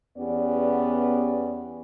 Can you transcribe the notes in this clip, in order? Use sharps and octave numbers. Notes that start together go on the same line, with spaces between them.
E2 B3 C#4 G4 D5